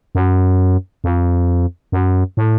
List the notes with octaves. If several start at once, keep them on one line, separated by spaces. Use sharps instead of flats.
F#2
F2
F#2
A2